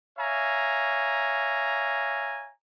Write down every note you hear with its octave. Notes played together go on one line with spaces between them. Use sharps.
C#5 E5 F5 G#5 A#5